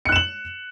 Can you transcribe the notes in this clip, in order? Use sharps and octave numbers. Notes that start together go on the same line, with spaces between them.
F#6 C#7 E7 F#7